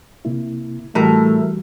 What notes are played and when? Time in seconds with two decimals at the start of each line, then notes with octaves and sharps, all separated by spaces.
0.25 C3 A#3 E4
0.95 A2 E3 G3 A3 F#4 A#4